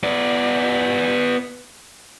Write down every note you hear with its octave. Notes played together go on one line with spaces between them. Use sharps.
B3 D5